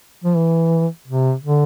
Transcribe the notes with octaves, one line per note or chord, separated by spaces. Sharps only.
F3
E3
C3
D3